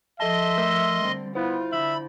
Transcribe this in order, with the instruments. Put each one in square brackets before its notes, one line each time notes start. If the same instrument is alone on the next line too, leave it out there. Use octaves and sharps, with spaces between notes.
[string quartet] F3 [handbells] A4 A5 [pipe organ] D#5 C6 [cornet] E5
[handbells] A3 A#4 E6
[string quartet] D3 G3 C4
[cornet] B3 [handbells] E4 C5 [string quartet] F4
[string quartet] D3 [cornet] E5 [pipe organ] B5